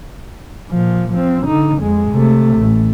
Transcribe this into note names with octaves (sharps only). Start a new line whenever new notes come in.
A#2 F3
F3 C4
D3 D#4
F2 G#3
C3 A3
A1 A3